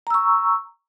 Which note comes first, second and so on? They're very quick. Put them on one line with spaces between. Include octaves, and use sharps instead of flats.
A#5 E6 C#6